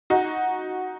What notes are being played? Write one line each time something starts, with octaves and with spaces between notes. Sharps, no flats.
D#4 F#4